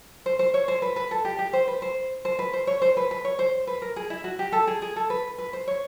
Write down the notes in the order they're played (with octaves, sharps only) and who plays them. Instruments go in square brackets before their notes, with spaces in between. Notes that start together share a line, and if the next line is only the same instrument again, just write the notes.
[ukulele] C5
C5
C#5
C5
B4
B4
A4
G4
G4
C5
B4
C5
C5
B4
C5
C#5
C5
B4
B4
C#5
C5
B4
A#4
G#4
E4
F#4
G4
A4
G#4
G#4
A4
B4
B4
C5
C#5